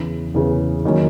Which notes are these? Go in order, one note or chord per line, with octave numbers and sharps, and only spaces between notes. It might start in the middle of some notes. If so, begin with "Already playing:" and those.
Already playing: E2 C#3 E3
E2 C#3 E3
D#3 F#3 A#3 C#4